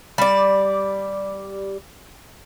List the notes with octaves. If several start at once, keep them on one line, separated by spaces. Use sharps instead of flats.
G3 D5